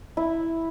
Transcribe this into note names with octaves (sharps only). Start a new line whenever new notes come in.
E4